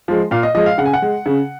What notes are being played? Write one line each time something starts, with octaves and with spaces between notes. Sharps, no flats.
F3 G#3
A#2 F5
D#5
F3 G#3 D#5
F5
C#3 F#5
G#5
F#5
G#3
C#3